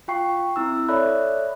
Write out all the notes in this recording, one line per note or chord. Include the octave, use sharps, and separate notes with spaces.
F4 F5 G5 C#6 C7
C4 E4 E6
A4 C#5 D5 E5 B5 F#6